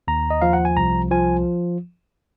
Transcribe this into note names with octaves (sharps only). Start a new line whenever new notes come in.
D#2 A#5
D#5
F3 F5
F#5
G#5
C2 A#5
F3 G#5